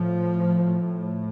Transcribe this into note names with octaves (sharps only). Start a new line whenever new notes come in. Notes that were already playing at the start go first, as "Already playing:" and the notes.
Already playing: A2 F3